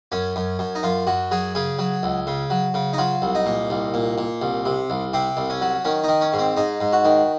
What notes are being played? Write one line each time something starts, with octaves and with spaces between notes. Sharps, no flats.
F#2 C#4
F#2
F#2
D#4
F#2 F4
F#2 F#4
F#3 G#4
C#3 G#4
F#3
C#2
C#3
F#3
C#3
D#4
F#3 F4
C2
D#4
A#2
C2
A#2
A#2
C2
C3
C2
C3 C4
C2
C#4
F#3
D#3 C#4
D#3 D#4
C#4
G#2
C4
G#2 D#4
G#2
F#4
D#3